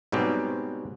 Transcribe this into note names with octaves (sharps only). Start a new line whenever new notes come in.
G#2 B2 F#3 G3 C4 G4